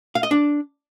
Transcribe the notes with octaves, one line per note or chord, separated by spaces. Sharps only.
F5
D#5
D4